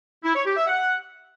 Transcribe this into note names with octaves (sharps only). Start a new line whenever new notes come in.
E4
C#5
G4
E5
F#5